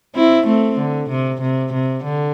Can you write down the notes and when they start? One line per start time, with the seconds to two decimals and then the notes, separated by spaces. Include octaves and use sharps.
0.15 C4 E4
0.47 A3 C4
0.78 D3
1.10 C3
1.41 C3
1.73 C3
2.04 D3